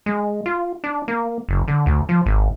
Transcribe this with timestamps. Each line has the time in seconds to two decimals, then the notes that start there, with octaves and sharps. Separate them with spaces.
0.06 G#3
0.46 F4
0.84 D4
1.08 A#3
1.49 F#1
1.68 D3
1.86 D2
2.09 F3
2.26 G#1